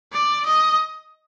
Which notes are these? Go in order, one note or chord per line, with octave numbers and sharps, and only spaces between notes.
D5
D#5